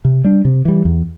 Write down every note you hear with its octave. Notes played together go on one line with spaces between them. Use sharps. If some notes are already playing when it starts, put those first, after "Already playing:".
C3
G3 D4
C3
E3 G3
E2